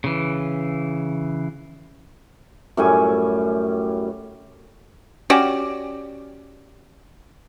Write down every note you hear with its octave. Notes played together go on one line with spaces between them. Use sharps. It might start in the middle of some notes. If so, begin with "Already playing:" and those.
C#3 E3
F#2 A2 G3 G#5
C#4 F#4 G4 D5